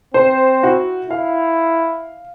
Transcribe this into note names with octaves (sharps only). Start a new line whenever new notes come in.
C4 C5
E4 F#4
E4 F5